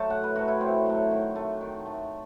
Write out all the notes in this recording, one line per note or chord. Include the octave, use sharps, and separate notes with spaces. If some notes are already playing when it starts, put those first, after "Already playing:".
Already playing: F#3 A3 C5 A5
A2 F#5
B4
F#3 A3 F#4
E4
A2 C4
F#3 A3
D#3
A3
D#3
A3